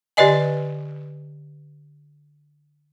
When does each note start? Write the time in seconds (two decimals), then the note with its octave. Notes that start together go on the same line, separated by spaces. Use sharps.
0.17 D3 G4 B4 D5 D#5 G#5